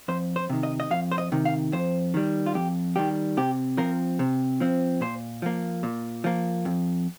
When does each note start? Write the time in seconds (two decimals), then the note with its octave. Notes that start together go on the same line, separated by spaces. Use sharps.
0.08 F2 C5
0.36 C5
0.50 C3 D#3
0.63 D#5
0.80 D#5
0.91 F2 F5
1.12 C5
1.18 D#5
1.32 C3 D#3
1.45 F5
1.72 F2 C5
2.14 D#3 G3
2.46 F4
2.54 F2 G4
2.96 D#3 G3 G4
3.37 C3 G4
3.77 F3 C4 A#4
4.19 C3
4.60 F3 C4
5.01 A#2 C5
5.42 F3 A#3
5.83 A#2
6.24 F3 A#3
6.65 F2